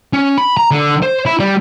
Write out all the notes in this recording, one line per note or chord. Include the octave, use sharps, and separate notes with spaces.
C#4
B5
A#5
D3
C5
E4
G3